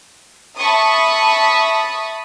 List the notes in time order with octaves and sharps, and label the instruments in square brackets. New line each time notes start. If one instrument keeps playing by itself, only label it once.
[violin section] E5 A5 B5 C#6 D#6